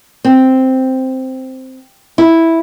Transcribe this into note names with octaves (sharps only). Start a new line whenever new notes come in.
C4
E4